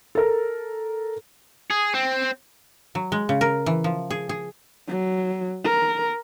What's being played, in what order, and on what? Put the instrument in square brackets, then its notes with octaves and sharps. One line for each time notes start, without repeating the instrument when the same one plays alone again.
[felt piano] A4 A#4
[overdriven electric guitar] G#4
C4
[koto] F#3
G#3
C#3
A#4
E3
F3
G#4
G#4
[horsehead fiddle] F#3
A#4